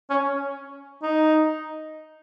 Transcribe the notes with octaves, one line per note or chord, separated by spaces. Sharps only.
C#4
D#4